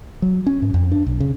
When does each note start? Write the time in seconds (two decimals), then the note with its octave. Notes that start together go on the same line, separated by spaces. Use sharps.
0.22 F#3
0.47 C#4
0.62 G#2
0.74 F2
0.92 D4
1.07 B1
1.20 C#3